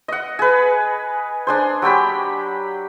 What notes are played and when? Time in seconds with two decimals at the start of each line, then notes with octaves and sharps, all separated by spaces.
0.08 D#5 F#5
0.39 G#4 B4
1.47 D4 G#4 C5
1.82 F#3 G4 G5 B5